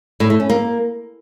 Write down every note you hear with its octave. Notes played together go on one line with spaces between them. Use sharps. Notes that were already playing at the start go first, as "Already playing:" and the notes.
A2
A3
C#4
A#3